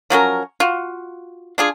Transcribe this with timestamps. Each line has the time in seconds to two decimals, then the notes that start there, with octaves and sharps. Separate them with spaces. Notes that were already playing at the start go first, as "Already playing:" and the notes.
0.10 F3 F#3 C#4 A#4
0.60 F4 F#4
1.58 D4 F4 G#4